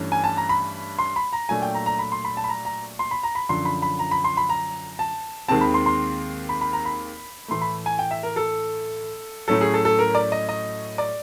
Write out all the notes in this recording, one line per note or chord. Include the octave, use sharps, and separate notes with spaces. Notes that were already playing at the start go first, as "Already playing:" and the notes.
Already playing: G2 E3 A3 C#4
G#5
A5
A#5
B5
C6
B5
A#5
A#2 F#3 A3 D4 G#5
G5
A#5
A#5
B5
C6
B5
A5
B5
A#5
A#5
C6
B5
A#5
B5
F#2 D3 F3 C6
B5
B5
A#5
B5
C6
B5
A#5
A5
D#2 D#3 G#3 C4 A5
B5
C6
C6
B5
B5
A#5
B5
A2 E3 A3 C6
B5
G#5
G5
E5
A#4
A4
A2 F#3 A3 C#4 A4
G#4
A4
A4
A#4
D5
D#5
D#5
D5